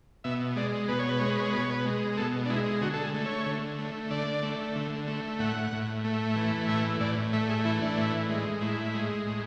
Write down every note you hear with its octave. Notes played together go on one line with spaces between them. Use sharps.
B2 E5
G#3 D5
B2 B4
C#5
B4
G#3 C#5
B4
C#5
B2 B4
C#5
B4
G#3
B2 A4
D4
G#3 E4
D3 F#4
A4
G#4
A3
C#5
D3
A3
D3 D5
A3
D3
A3
A2 F#5
A2
A3
E3
A2 E5
A2 D5
A3 E5
G#4
E3 E4
D4
A2
G#3
A2 E4
G#3
A2